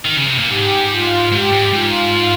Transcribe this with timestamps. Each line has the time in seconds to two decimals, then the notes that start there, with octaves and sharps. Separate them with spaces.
0.05 D#3
0.17 C#3
0.28 C3
0.39 A#2
0.50 G#2 G4
0.91 F4
1.32 G#2 G4
1.52 G#2
1.72 G#2 F4